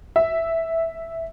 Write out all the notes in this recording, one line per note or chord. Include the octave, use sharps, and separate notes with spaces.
E5